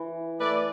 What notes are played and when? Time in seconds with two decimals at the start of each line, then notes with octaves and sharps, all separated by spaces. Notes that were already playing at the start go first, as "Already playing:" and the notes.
Already playing: E3
0.39 A3 E4 B4 D5